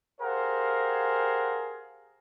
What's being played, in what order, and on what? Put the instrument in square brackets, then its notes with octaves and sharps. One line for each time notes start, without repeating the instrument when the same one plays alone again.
[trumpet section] G4 G#4 A#4 C5 F5 F#5